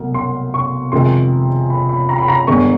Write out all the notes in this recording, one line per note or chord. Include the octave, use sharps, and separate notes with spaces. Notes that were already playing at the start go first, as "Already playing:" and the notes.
Already playing: C2 B2 F#3 A3
C6
C#6
F2 C3 D#3 G#3 C6
B5
B5
A#5
B5
A#5
G1 G2 D#3 G#3 B3 C#6